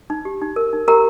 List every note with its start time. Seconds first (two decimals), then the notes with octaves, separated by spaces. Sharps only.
0.10 D#4
0.25 G4
0.42 D#4
0.56 A#4
0.73 D#4
0.88 G4 A#4 A#5